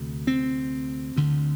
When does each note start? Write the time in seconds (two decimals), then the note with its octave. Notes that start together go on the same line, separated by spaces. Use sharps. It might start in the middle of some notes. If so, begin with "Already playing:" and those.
Already playing: D2 C3
0.27 C4
1.16 D2 D3